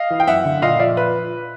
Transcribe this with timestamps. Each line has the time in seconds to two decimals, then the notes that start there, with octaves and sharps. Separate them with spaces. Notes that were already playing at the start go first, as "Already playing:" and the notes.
Already playing: D#5 F5
0.10 E3
0.20 G5
0.27 F#2 E5 F#5
0.45 D3
0.62 A#2 D#5 F5
0.79 F3 D5 E5
0.97 B4